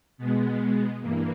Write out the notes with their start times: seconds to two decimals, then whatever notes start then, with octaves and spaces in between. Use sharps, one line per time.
0.18 B2 G#3 B3
1.00 G2 E3 A#3